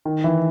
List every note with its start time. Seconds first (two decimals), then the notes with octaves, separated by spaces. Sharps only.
0.05 D#3
0.24 E3